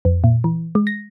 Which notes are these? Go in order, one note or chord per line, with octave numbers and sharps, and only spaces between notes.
F2
A#2
E3
G#3
A#6